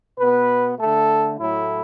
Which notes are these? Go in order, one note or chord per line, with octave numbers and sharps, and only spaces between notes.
B2 B3 B4
D3 A3 A4
A2 F#3 A3 E4